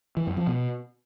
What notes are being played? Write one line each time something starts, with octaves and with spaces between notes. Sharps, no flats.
E3
F#2
F3
B2